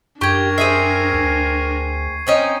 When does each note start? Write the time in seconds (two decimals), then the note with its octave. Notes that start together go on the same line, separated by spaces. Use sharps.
0.21 F#2 D4 G4 A#4 G5 C#6 G#6
0.58 C4 G#4 E5 C7 D#7
1.13 D2
2.27 C4 C#4 D#4